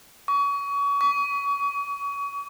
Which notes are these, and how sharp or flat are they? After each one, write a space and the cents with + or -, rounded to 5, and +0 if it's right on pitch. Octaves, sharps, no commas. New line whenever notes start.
C#6 +35
C#6 +45